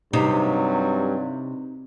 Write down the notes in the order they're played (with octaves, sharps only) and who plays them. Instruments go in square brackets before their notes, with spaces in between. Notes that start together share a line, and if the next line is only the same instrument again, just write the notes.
[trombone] G2 [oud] C3 [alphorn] F#3 [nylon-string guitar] D#4